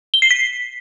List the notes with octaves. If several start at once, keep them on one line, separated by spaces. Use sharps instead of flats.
G7
C7
B6